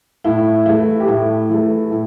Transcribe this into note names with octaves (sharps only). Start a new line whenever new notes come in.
A2 E4
E3 A3 E4
G4
A2 E4
E3 A3
A2